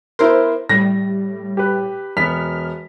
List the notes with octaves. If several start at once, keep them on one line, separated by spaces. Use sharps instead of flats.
B3 E4 A#4 C5
A2 G3 A#6
G4 B4
E1 B3 F6 B6